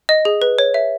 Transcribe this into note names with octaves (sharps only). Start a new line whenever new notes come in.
D#5
G#4
B4
C#5
E5